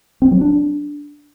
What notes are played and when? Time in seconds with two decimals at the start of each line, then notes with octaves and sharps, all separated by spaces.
0.22 C4
0.31 F#3
0.41 D4